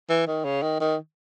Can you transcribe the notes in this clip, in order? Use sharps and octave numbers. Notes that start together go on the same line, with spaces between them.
E3
D#3
C#3
D#3
D#3